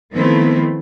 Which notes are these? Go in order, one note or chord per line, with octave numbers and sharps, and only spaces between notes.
D#3 F3 A3 B3 C4 E4